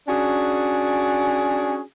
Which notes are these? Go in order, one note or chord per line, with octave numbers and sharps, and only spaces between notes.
C#4 D4 F#4 G#4